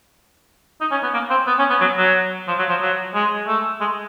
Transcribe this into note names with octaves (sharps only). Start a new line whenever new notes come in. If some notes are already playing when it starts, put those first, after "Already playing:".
D#4
C#4
B3
A#3
C4
B3
C#4
B3
F#3
F#3
F3
F#3
F3
F#3
G#3
A3
G#3